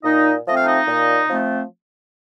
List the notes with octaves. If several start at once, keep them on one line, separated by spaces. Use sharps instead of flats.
A#2 D#4 D#5
F3 A3 C4 D#5
F5
D#4 D#5
A#2
F3 A3 C4